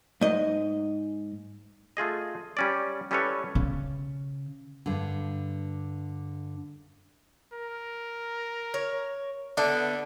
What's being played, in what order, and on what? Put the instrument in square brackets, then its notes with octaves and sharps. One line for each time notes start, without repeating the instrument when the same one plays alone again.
[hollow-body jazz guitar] G#2 D#5
[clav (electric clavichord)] A3 F4 G#4 D#5
G3 C#4 D5
G3 C#4 E4 A4 B4 C#5
[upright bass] C#3
[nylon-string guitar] G2 D3
[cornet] A#4
[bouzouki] C#5
[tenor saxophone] D3 [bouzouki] B3 E4 [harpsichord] D4